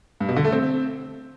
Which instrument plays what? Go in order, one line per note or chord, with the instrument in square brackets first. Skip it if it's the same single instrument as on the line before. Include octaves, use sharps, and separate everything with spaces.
[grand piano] G2
B2
D3
A3
C4